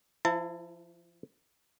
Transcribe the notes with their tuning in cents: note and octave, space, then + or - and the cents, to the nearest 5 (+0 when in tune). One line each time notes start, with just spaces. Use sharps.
F3 -25 E4 +20 A5 +35